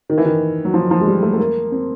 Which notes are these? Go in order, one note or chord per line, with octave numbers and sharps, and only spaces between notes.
D#3
E3
D#3
F#3
F3
F3
G#3
G3
A3
A3
A#3
C4